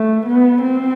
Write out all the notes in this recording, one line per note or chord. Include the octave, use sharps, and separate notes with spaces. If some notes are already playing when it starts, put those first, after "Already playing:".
Already playing: A3
B3
C4